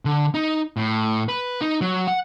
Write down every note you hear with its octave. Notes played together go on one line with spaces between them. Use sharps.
D3
D#4
A2
B4
D#4
F#3
F#5